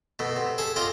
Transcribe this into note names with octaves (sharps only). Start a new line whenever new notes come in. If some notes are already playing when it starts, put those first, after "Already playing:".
B2 A3
C3
G#4 A4 A5
C3 F4 D#5 G5 D6